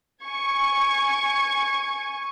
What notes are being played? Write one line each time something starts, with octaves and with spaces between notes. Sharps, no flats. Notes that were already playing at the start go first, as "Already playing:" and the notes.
G#5 C#6 G#6